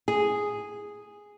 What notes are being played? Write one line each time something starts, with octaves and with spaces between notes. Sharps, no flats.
G#4